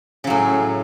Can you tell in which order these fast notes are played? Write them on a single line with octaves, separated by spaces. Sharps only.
C#3 F#3 A2